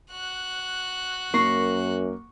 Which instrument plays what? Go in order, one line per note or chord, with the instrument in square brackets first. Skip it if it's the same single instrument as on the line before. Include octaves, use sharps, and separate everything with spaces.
[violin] F#4 F#6
[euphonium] F#2 [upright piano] A#3 [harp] A#5 C#6 C7